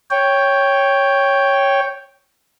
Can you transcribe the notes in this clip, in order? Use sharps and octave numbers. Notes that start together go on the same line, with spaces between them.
C#5 G5